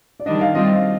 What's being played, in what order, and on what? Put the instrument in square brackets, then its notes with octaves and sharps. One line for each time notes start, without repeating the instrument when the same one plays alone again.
[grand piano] D5
[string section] D#3 G3 D4 [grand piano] D#5
[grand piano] F5
[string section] G3 C4 F4 [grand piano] D#5